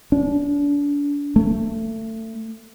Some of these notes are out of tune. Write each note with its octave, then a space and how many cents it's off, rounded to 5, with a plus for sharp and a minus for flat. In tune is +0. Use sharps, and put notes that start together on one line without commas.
D4 -35
A3 +25